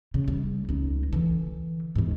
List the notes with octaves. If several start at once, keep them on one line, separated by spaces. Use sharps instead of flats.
C#3
G3
C#2 D#4
D3 E3
E2 G#2